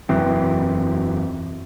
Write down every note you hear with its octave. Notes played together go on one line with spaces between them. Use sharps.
E1 F#2 E3 C4